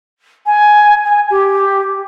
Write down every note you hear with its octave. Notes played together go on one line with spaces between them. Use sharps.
G#5
G#5
G4